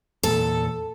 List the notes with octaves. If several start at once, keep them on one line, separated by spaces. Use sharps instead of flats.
E2 A#2 A4